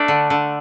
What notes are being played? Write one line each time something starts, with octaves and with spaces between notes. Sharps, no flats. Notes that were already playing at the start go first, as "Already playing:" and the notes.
Already playing: A3 D4
D3
D3